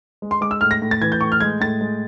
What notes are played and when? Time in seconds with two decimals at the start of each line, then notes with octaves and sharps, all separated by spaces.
0.22 G#3
0.31 C6
0.41 G#3 D6
0.51 E6
0.61 A2 F6
0.71 A#6
0.82 A2
0.91 A6
1.01 E3 G#6
1.12 G6
1.21 A2 C#6
1.32 F6
1.41 G#3 G#6
1.60 A2 A6
1.81 G#3